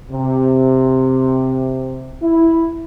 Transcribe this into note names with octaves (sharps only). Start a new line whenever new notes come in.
C3
E4